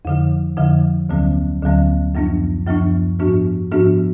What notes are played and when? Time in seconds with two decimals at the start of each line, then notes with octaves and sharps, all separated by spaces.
0.05 F2 D3 F3
0.57 F2 D3 F3
1.09 D2 D3 F#3 B3
1.62 D2 D3 F#3 B3
2.15 F#2 F3 B3 D4
2.67 F#2 F3 B3 D4
3.19 G#2 F3 B3 D4 F#4
3.72 G#2 F3 B3 D4 F#4